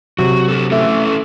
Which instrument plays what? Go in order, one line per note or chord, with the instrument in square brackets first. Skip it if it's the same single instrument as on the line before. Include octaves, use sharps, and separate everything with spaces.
[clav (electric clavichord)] C3 F#3 [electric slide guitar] F#4
[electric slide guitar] F#4 A4
[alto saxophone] A3 [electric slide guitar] C#4 E4 A4